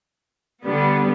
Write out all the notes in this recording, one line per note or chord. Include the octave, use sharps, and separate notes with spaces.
D3 G3 B3